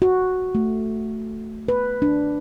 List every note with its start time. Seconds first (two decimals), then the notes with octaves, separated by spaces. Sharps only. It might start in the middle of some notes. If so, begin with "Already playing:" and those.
0.02 F#4
0.55 A3
1.68 B4
2.02 D4